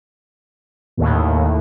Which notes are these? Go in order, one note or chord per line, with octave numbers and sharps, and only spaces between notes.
D#2 A2